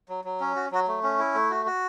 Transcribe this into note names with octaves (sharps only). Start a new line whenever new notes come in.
F#3
F#3
C#4
F#4
F#3 F#4
A3
C#4
E4
A3
F#4
F#4